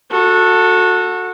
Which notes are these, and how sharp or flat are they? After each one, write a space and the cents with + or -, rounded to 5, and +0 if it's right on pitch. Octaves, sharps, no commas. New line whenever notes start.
F#4 -20 A4 +15